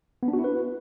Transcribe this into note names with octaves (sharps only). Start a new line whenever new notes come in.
B3
D4
F#4
E4
B4